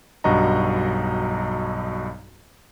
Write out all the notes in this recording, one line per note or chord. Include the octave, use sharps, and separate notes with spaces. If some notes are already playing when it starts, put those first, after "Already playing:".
B1 G2 F#4 D#5 A#5